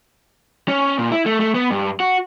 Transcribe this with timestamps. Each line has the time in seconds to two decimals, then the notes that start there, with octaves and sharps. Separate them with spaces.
0.68 C#4
0.99 A#2
1.12 E4
1.26 A3
1.40 A3
1.55 B3
1.71 G2
2.00 F#4